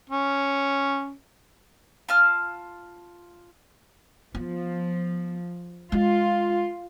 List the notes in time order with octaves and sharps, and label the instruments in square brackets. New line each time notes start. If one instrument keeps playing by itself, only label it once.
[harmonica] C#4
[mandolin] F4 A5 F6
[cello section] F3 [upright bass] B3
[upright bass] G#3 [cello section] F4